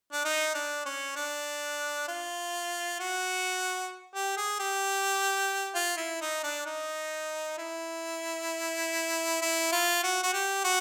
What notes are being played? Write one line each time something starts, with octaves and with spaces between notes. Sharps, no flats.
D4
D#4
D4
C#4
D4
F4
F#4
G4
G#4
G4
F4
E4
D#4
D4
D#4
E4
E4
F4
F#4
F#4
G4
F#4